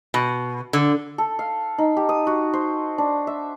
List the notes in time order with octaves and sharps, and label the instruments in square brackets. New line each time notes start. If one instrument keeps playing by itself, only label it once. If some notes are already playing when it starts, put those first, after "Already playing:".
[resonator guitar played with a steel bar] B2
D3
[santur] A4
F5
D#4
G4
D#6
F#4
C5
D4
E5